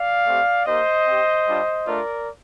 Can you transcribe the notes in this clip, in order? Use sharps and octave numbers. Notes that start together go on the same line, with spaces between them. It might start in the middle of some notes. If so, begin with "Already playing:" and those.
Already playing: D5 F5
A3 C4 G4
A#3 D#4 G4 C5 D#5
C4 G4
G3 D4 F4
A3 D4 F4 A#4 D5